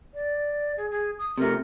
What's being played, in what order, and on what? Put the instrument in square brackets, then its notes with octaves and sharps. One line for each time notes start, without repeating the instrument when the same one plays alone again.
[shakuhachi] D5
G#4
G#4
D#6
[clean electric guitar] C3 A3 [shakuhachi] A#4